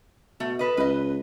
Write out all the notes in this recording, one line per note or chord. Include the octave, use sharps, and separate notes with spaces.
B2 A3
A4 B4 D#5
C#2 B4 D#5